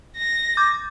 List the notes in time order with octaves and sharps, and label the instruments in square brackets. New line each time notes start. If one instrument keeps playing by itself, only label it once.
[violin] A#6
[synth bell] D6 G6 A6